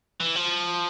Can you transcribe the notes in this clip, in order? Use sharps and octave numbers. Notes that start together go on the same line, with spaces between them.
E3
F3